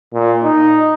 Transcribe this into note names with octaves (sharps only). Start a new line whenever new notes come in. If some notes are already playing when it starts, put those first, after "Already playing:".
A#2
D#4